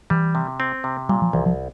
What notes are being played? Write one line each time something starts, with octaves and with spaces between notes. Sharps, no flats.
E3 G3
C3
C4
C3
A#2 G3
F3
C2 E3
F3